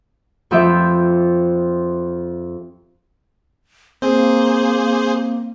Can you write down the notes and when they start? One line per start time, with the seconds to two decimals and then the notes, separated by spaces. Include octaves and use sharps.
0.51 F2 F3 B3 G4 E5
4.02 A#3 C4 G#4 C5